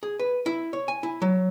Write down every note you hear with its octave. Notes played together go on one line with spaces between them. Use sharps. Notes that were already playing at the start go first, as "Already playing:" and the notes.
G#4
B4
E4
C#5
G#5
E4
F#3